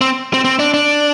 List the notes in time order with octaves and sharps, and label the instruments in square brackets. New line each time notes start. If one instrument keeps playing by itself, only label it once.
[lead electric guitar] C4
C4
C4
D4
D4